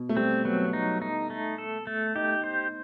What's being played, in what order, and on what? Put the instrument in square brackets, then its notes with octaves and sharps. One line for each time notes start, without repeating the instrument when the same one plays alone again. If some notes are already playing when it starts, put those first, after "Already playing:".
Already playing: [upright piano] B2
A3
[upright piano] G3 [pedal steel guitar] C4
[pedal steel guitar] F#3 [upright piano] B3
[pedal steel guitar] D#4
D#4
A3
A4
A3
[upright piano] D#4 [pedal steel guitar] G4
[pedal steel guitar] C5